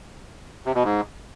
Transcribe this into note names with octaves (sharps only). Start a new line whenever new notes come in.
C3
B2
G#2